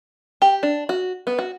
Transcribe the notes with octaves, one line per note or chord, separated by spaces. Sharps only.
G4
D4
F#4
B3
F#4